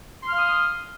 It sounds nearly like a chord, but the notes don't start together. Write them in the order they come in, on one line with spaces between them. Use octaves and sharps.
C6 F6 F5 D#6